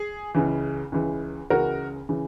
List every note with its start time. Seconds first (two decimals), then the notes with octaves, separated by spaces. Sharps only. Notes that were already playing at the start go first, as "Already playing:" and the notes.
Already playing: G#4
0.35 C#2 C#3 E3
0.92 C#2 C#3 E3
1.50 C#2 C#3 E3 F#4 A#4
2.09 C#3 E3